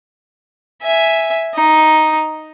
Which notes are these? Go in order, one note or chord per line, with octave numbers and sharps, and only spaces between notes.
E5 G#5
D#4